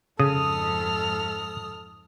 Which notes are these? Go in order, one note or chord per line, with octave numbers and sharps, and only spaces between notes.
F2 G#2 C#3 A4 D#6 F6